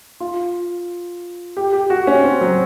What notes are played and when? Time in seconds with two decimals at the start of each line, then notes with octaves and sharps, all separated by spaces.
0.20 F4
1.57 G4
1.73 G4
1.90 F#4
2.07 C#4
2.24 C4
2.41 F#3